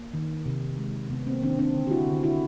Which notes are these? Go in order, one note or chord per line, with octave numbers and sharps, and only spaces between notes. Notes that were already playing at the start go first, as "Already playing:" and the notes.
Already playing: A#3
D#3
C3
G#3
C3 B3
A#3 C4
D#3 C4 D4
C4 D4
D3
G4
E4 F#4
D3
E4 F#4